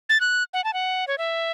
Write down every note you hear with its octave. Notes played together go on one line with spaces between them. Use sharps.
A6
F#6
F#5
A5
F#5
C#5
E5